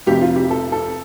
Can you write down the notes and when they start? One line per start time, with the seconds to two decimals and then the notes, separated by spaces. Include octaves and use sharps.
0.06 F1 F2 C3 G4
0.21 F4
0.36 G4
0.50 A4
0.72 A4